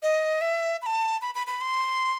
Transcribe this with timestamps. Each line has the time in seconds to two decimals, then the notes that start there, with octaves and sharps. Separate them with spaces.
0.03 D#5
0.41 E5
0.82 B5
0.86 A5
1.22 B5
1.35 B5
1.47 B5
1.61 C6